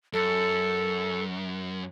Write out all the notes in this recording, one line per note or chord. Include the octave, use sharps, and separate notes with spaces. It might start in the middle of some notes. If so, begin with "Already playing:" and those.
F#2 A4